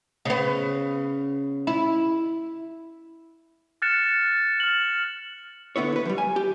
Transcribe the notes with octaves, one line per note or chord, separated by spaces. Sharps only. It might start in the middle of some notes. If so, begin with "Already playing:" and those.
C#3 B3
E4
F6 F#6 A6 C#7 E7
F6 A6 F#7
D3 B3 E4 C#5
D#2 B4
F3 G3
G#5
G4